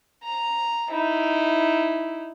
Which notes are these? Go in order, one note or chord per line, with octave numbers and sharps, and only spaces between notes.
A#5
D#4 E4